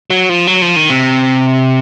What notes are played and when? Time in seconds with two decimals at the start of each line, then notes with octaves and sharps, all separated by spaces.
0.10 F#3
0.29 F3
0.47 F#3
0.62 F3
0.76 D#3
0.90 C3